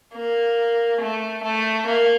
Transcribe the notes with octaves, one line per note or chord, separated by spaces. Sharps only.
A#3
A3
A3
A#3